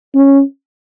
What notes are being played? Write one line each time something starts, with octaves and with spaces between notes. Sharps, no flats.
C#4